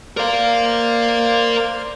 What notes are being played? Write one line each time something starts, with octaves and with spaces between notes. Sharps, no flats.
A#4 C5 D5 F5 F6